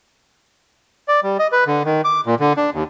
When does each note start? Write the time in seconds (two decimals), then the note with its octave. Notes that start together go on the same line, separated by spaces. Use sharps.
1.08 D5
1.23 G3
1.39 D#5
1.52 B4
1.67 D3
1.85 D#3
2.05 D6
2.26 A#2
2.40 D3
2.57 D4
2.74 D#2